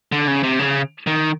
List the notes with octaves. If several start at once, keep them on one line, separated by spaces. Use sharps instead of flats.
D3
C#3
C3
C#3
D#3